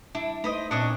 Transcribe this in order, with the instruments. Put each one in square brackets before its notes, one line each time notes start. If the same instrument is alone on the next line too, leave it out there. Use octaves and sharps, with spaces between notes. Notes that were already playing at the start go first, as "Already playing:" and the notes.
[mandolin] D4 [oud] E4
[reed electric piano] A3 D#4 [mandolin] B4 C5 D#5
[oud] A#2 [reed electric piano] B3 C4 [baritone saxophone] D4 [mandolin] C#5 D#5 C#6